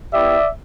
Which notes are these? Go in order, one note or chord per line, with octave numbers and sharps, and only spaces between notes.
B3 E4 G4 D5 E5